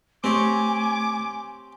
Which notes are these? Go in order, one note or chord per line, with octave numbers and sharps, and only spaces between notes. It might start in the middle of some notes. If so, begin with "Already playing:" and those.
A3 C4 G4 C#5 G#5 D6